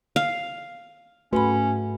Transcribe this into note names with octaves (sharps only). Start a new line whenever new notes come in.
F5
G#2 A3 C#4 F#4 B4 B5